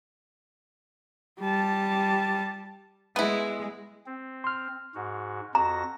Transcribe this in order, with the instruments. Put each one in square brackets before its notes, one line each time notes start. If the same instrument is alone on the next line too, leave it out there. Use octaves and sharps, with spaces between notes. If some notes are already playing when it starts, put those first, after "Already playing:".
[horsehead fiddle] G3 A5
[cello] G#3 [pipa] B3 E4
[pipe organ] C4
[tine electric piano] C6 F6
[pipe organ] G#2 F#4
[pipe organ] F2 F#4 A#6 [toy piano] A#5